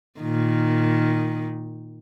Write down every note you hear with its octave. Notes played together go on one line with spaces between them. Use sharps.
A#2 D#3